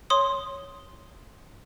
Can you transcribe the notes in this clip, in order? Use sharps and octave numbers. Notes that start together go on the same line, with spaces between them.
C#5 C6 D#6